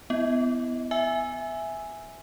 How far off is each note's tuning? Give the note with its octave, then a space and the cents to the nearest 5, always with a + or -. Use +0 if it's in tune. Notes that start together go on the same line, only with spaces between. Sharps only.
B3 +20 E4 +0 D#5 +30
E5 +0 G#5 +0 E6 +0